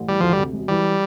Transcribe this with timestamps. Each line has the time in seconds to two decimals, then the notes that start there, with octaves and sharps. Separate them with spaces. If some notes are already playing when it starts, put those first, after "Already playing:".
Already playing: A1
0.08 E3 G3
0.20 D2 F3
0.33 G3
0.38 C3
0.53 E1
0.68 E3 G3